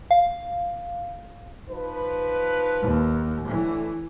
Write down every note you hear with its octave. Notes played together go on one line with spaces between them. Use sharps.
F5
F3 D#4 B4
D#2
A2 D3 E3 A3